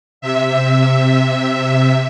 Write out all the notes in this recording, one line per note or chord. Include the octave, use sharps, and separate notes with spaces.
C3 E5